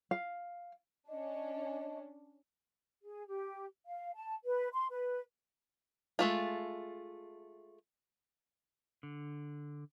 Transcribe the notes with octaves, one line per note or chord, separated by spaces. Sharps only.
F5
C#4 D4 D#5
G#4
G4
F5
A5
B4
C6
B4
G#3 A3 F4
D3